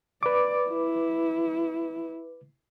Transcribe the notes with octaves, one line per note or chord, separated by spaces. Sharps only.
B4 D5 D6
E4